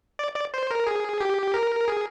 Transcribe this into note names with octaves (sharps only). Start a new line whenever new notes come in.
D5
D5
C5
A#4
G#4
G4
A#4
G#4